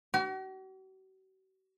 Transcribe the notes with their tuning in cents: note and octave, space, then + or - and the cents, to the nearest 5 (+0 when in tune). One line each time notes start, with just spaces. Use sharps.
F#4 +45